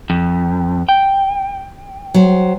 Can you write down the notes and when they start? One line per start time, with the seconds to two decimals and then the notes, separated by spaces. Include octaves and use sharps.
0.10 F2
0.89 G5
2.14 F#3 C5